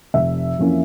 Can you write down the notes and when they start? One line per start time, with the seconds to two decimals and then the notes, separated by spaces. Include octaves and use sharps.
0.14 F1 E5
0.59 F2 E3 A#3 C#4